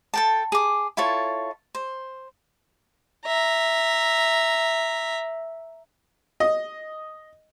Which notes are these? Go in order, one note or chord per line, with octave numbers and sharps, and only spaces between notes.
A4 G5 A5
G#4 D6
E4 F4 A4 C#5
C5
E5 A#5
D#5